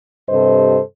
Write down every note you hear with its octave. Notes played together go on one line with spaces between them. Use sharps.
G2 C3 A4 C5 D#5